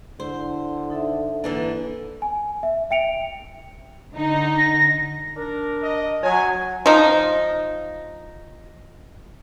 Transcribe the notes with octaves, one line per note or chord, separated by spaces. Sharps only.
D3 E4 C5 C6
D#4 A4 E5
D3 E3 A#3 D4 A4
G#5
E5
E5 G5 C#7 D7 F7
D3 D#4
A#6
D4 A#4
D#5
F#3 C#5 G#5
F3 D#4